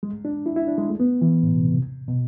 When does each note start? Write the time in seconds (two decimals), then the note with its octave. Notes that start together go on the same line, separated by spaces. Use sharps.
0.03 G#3
0.25 D4
0.46 E4
0.56 E4
0.68 D4
0.78 G#3
0.89 A3
1.00 B3
1.22 E3
1.43 A2
1.54 B2
1.65 C3
2.08 B2